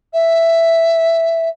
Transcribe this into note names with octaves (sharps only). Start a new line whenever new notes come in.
E5